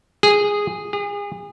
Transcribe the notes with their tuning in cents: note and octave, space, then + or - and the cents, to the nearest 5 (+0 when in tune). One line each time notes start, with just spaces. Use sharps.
G#4 -10
G#4 -35